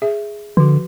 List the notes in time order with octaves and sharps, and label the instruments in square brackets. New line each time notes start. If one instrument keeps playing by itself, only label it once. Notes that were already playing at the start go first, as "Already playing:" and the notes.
[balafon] G#4 E5
[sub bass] D3 [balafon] F3 F#4